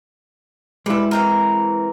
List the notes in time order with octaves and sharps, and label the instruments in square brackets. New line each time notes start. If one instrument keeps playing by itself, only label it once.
[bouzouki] G3 B4 [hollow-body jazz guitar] G#3 E4
[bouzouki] E3 C4 A#4